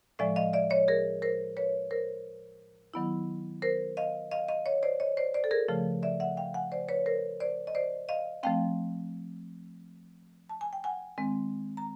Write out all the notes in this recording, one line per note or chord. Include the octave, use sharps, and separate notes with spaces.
A2 F3 G#3 D5 E5
D#5 F5
D5 E5
C#5 D#5
G#4 A#4
A#4 C5
B4 C#5
A#4 C5
D#3 F#3 B3 E4
A#4 C5
D#5 F5
D#5 F5
D#5 F5
C#5 D#5
C5 D5
C#5 D#5
C5 D5
C5 D5
A4
G#4 A#4
C#3 F3 A3
D5 E5
E5 F#5
F5 G5
F#5 G#5
C5 D5
B4 C#5
A#4 C5
C5 D5
D#5
C5 D5
D#5 F5
F3 A3 C4 F5 G5
A5
G#5
G5
F#5 G#5
D#3 G#3 C4
A#5